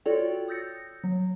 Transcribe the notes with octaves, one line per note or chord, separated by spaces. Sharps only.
F4 F#4 A4 C#5 D5 G5
D#6 E6 G6 A6 A#6 C#7
F#3